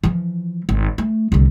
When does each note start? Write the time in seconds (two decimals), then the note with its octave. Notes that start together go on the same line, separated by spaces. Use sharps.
0.04 E3 F3
0.69 G#1
0.98 A3
1.32 C2 D3